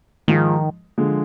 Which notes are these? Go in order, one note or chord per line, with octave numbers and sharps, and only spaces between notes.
G#2 D#3 F3 G#3
D3 F3 G#3